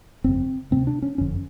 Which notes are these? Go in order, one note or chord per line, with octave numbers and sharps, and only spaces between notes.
G1 F2 C#3 C4
D2 C3 C4
D4
C#4
F#1 F2 D3 C#4